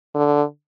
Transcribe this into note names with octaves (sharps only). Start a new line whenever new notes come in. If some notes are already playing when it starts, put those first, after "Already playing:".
D3